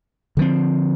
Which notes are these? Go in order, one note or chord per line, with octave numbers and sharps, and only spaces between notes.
D3 F3 C4